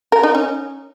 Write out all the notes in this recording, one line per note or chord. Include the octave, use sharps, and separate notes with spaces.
A#4
D#4
C#4